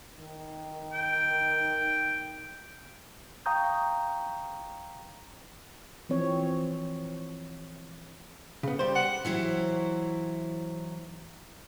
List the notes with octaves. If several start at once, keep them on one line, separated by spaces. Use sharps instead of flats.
D#3
G5
F5 G5 A#5 C#6 D#6 G6
E3 F3 C4 C#5
C#3 B3
G3 C5
F#5
E3 F#3 E4 C5